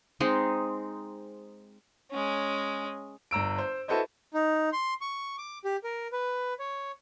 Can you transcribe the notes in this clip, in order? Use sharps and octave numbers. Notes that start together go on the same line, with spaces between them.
G#3 C4 D#4 G#4
G#3 C#4
G1 A#5 E6 D7
C5
E4 F#4 A4 B4 C5 D#5
D#4
C6
C#6
D6
G4
A#4
B4
C#5